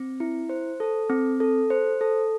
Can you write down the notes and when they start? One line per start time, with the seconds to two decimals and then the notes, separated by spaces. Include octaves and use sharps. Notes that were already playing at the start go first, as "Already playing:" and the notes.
Already playing: C4
0.20 E4
0.49 C5
0.80 A4
1.10 C4
1.40 A4
1.70 C5
2.01 A4